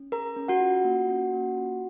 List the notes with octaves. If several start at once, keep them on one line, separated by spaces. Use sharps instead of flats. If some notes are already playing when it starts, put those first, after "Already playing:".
Already playing: C#4
G#4 A#4 A#5
C#4
F#4 F#5
F4
A#3
C#4
A#3
F4